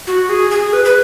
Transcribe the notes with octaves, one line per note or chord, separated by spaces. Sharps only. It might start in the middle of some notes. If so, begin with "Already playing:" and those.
F#4
G#4
G#4
B4
B4